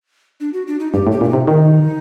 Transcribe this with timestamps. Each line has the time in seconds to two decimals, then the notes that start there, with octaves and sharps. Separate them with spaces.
0.40 D4
0.53 F#4
0.67 D4
0.80 D#4
0.93 G2 G4
1.07 A2
1.12 G4
1.21 A#2
1.24 D4
1.29 C3 D#4
1.47 D#3 D#4